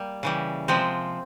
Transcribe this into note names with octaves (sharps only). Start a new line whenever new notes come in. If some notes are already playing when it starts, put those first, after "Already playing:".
Already playing: G3 A#3
C#3 E3 G3
C3 F3 G#3 C4